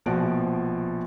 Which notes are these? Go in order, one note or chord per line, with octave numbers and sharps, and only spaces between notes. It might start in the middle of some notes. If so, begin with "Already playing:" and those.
A#1 B2 F3 F#4 D7